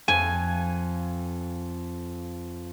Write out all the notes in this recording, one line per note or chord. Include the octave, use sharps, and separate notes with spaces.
F2 G#5